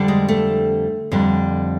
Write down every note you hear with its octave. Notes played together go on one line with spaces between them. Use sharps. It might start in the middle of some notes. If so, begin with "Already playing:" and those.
Already playing: F2 D3 G3
G#3
A3
F2 D3 G3